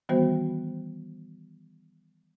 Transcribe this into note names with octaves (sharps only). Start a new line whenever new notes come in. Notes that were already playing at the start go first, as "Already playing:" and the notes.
D#3 E3 G3 B3 F#4 C5